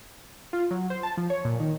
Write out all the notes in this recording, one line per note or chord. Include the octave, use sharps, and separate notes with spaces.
F4
F#3
C5
A5
F3
C#5
A#2
D#3